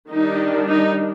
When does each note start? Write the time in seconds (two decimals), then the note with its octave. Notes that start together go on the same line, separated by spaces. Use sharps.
0.10 D#3 G3 D4 D#4
0.69 D#4